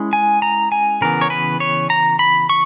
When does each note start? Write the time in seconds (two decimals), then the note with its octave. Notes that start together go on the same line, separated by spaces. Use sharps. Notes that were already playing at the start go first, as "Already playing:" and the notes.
Already playing: G#3 C#4 E4
0.13 G#5
0.42 A#5
0.72 G#5
1.01 C#3 E3 B3 A#4
1.21 C#5
1.30 B4
1.60 C#5
1.90 A#5
2.19 B5
2.49 C#6